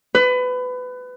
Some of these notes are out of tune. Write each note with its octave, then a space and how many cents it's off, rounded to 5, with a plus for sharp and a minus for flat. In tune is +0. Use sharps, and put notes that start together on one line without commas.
B4 +25